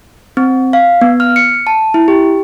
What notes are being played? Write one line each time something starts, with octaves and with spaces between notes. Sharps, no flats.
C4
F5
B3
F6
C#7
A5
E4
G4